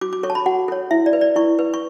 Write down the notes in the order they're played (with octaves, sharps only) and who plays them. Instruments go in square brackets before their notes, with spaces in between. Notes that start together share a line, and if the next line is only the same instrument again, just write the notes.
[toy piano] F#4 D6
D6
A4 C#5 C#6
A5
B5
F#4 F#5
A4 C#5
E4 E5
D5
B4
D5
E4 C#6
B4
C#6